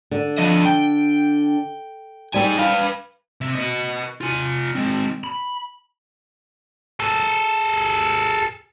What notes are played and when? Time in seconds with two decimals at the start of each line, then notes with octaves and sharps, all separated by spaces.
0.11 D3
0.38 F3 D#5
0.66 G5
2.34 G3 C4 D#4 G#5
2.59 B4 F5
3.41 C3 E5
3.55 B4 D#5
4.21 F4 G#5
4.75 G#3 C4
5.24 B5
7.00 G#4 A4